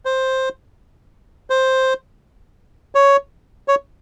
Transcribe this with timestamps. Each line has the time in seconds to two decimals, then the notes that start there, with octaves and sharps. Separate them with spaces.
0.05 C5
1.50 C5
2.95 C#5
3.68 C#5